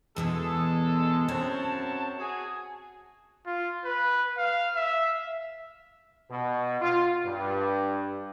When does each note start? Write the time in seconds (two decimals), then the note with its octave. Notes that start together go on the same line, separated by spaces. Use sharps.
0.16 E2 B2 E3 G#3 G#4 A4
1.28 F#2 C4 C#5 A5
2.20 F#4 G#4
3.47 F4
3.85 B4
4.38 F5
4.77 E5
6.30 B2
6.82 F4
7.26 G2